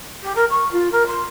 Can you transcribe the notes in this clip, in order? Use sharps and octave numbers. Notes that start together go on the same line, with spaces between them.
G4
A#4
C#6
F4
A#4
C6